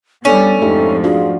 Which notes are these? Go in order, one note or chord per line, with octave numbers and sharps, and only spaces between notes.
G3 B3 C#4 D4 A4 D5
F2 G#2 F3 A3 D#4 G4
D4 F4 F#4 G#4